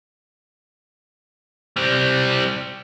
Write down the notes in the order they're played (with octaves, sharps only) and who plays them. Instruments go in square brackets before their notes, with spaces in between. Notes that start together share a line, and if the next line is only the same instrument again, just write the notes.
[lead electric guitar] G3 C4